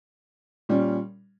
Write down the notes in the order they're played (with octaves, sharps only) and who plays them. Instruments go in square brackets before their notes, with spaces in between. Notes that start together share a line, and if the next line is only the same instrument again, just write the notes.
[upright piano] A#2 G3 C#4